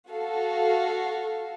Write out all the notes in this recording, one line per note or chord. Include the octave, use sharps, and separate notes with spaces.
F#4 A4 F5